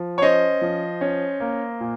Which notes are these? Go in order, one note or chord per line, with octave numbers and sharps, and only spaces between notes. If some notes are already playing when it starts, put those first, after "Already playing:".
Already playing: F3
C#5
C#4 C5 D#5
F3
C#4
A#3
A#2